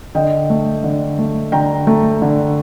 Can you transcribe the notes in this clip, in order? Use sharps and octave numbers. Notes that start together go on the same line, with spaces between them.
D3 D#5 G5
A3
D3
A3
D3 G5 A#5
A3
D3